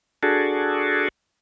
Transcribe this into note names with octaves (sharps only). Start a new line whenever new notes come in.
D4 F#4 G#4 A4